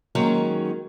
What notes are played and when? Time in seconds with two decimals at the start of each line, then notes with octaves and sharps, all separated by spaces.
0.15 D#3 F#3 G#3 A#3 C#4